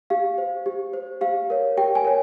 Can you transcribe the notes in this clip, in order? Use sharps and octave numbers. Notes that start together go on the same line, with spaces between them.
G4 F5
C5
G4
C5
G4 F5
A#4 C#5
G4 G5
G#5
A#4 C#5